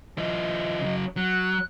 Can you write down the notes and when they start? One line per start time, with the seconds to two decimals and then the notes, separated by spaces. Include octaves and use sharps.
0.18 F3 E4 D#5
0.81 C#3 F#3
1.17 F#3 F#6